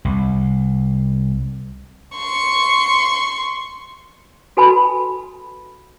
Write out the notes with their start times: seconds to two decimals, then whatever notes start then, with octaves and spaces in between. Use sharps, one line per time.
0.05 C2
2.17 C6 C#6
4.57 F#4 A4 B4 G#5 A5 B5